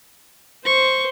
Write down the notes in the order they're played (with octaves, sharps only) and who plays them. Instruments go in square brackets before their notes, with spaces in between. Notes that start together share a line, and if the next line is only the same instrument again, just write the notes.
[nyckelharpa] C5 [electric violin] C#6